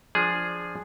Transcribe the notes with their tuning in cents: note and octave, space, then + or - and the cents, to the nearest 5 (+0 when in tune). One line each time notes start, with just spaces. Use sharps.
F3 +0 D4 +0 G#4 +0